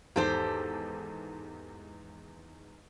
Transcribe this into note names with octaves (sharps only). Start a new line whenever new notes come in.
E2 G#2 D#3 G4 A4 C5